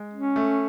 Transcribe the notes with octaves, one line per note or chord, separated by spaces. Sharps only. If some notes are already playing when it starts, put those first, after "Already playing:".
Already playing: G#3
C#4
A3